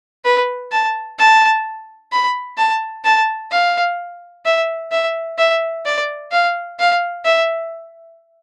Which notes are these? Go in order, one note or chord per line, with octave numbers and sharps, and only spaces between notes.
B4
A5
A5
B5
A5
A5
F5
E5
E5
E5
D5
F5
F5
E5